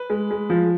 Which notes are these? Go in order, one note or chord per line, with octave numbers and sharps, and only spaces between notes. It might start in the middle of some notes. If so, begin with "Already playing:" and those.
Already playing: B4
G#3
G#3
F3